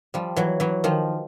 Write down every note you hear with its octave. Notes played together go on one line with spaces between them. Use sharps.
F3 G3
E3 F#3
E3 F#3
D#3 F3